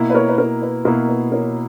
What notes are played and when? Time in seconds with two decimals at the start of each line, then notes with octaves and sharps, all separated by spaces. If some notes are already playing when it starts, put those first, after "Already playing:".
Already playing: B2 A#3 E4
0.10 B4
0.15 A#4 C#5
0.29 B4
0.38 A#4
0.62 B4
0.85 B2 A#3 E4 A#4
1.08 B4
1.32 A#4 C#5